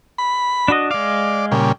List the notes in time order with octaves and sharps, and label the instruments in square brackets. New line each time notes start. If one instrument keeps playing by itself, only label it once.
[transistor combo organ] B5
[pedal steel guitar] D4 F#4 D#5
[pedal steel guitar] G#3 F5 [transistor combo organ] D5
[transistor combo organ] A#2 C#3 G3